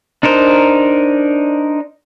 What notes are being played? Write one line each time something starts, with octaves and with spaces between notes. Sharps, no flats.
D4 D#4 A#4 C5